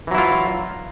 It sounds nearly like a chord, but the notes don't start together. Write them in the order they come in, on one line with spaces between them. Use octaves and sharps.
E3 F#3 E4 F4